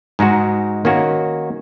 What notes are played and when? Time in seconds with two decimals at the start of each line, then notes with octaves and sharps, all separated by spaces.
0.19 G#2 G#3 D#4 F#4
0.85 D#3 A#3 C#4 F#4